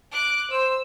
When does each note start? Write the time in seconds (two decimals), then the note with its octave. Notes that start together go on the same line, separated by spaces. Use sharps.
0.12 D6 F#6
0.51 C5 E6